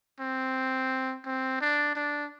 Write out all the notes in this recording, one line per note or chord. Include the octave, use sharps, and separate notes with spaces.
C4
C4
D4
D4